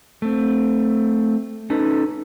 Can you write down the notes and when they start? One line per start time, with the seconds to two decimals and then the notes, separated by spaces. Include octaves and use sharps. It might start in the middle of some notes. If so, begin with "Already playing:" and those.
0.22 A3 C4
1.70 C#4 D#4 A4 B4